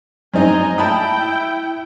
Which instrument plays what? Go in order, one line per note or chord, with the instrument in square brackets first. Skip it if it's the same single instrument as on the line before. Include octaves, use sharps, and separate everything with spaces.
[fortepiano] F#2 C4 D#4 [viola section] D#5 G#5 A#5
[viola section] E4 G5 [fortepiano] A5 B5 D#6